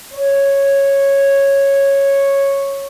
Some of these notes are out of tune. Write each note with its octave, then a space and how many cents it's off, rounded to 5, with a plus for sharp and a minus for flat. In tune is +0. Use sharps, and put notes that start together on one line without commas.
C#5 -5